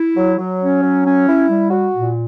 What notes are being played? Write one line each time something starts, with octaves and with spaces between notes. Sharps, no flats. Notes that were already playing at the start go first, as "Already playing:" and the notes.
Already playing: E4
F#3
F#3
C#4
F#3
C#4
E4
G3
F#4
A#2